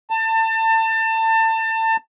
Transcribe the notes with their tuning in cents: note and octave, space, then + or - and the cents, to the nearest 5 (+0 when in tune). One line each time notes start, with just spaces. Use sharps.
A5 +30